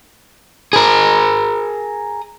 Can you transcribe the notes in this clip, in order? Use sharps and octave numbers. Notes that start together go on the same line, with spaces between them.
G#4 A#4